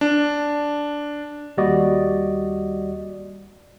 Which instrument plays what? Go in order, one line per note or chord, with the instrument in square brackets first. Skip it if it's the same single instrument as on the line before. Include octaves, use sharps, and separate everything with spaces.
[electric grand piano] D4
[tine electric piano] D#2 G3 F#4 D5 D#5